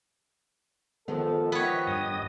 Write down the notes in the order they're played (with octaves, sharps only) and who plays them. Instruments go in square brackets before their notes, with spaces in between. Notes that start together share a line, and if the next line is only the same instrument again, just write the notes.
[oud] D#3 F3 [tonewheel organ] G#3 B3 [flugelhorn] A4
[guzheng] B3 C#5 [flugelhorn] G4 [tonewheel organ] D#5 E5
[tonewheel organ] G2 D#5 D#6